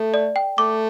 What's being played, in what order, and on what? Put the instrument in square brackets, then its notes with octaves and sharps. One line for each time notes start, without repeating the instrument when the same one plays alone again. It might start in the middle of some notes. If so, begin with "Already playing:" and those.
Already playing: [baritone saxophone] A3 [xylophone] A4
[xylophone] D5
G5
[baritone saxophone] A3 [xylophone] D6